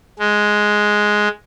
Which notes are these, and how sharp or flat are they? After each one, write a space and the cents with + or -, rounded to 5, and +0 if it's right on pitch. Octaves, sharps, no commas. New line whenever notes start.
G#3 +5